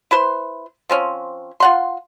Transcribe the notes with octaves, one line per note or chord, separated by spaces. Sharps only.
E4 B4 C5 C6
F3 C4 C#4
F4 F#5 C6